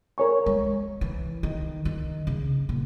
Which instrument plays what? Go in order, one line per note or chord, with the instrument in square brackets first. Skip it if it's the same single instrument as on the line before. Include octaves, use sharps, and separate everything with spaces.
[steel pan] A#4 C#5 G#5 C#6
[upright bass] G#3
E3
D#3
D#3
C#3
A#2